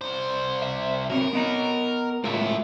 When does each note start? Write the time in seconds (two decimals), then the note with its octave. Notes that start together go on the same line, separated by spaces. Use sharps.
0.02 C2 C5
0.62 E5
1.10 F#3 B3 C4 A#4
1.33 B3 D#5 A#5
2.24 A2 G#3 F4 A#4 E5